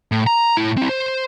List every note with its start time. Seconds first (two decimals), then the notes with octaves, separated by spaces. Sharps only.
0.12 A2
0.27 A#5
0.57 A2 E4
0.77 C4 E4
0.89 C5